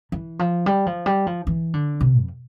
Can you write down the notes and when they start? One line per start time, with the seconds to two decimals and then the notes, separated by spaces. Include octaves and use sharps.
0.12 E3
0.39 F3
0.66 G3
0.86 F3
1.06 G3
1.27 F3
1.47 E3
1.74 D3
2.01 C3
2.21 F2